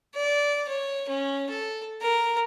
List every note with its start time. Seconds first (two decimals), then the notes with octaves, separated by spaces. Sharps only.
0.14 D5
0.68 C#5
1.08 C#4
1.49 A4
2.01 A#4